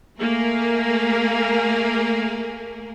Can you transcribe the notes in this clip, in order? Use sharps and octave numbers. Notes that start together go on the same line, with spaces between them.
A3 A#3 G#4 A#4